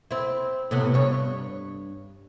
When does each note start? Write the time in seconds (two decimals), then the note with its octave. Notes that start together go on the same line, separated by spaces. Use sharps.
0.11 C4 E4
0.71 A2 C3 B3
0.94 G2 C#5